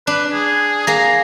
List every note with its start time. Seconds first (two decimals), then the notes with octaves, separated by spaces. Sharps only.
0.07 D4 B4
0.33 G#4
0.87 A#3 G#4 A#5